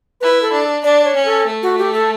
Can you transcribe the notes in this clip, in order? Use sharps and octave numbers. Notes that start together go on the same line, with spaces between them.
E4 B4
A4
D4
D4 D5
C#5
C#4
A4
A3
F#4
G4
A4